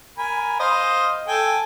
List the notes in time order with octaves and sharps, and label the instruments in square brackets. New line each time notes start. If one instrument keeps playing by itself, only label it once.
[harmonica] A#4 G#5 B5
C5 D#5 F5
A4 G5 G#5